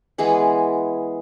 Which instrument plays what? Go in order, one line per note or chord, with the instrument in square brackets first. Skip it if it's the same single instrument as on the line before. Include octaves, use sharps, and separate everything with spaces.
[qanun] E3 G#3 B3 G#4